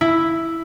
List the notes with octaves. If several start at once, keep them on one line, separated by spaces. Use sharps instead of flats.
E4